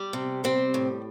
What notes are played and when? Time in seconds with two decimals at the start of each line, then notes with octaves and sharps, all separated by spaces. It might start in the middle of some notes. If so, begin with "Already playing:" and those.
Already playing: G3
0.13 C3
0.44 G3 C4
0.74 A2